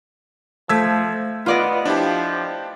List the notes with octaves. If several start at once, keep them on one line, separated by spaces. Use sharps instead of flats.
F3 A3 E6 G#6 B6
B3 F4 D5 D#5
F3 D4 E4 G4